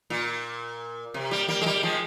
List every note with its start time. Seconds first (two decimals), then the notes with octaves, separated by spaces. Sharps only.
0.10 A#2
1.14 C3
1.31 G3 A#3
1.48 G3 A#3
1.61 G#3
1.66 G3 A#3
1.83 F3 G#3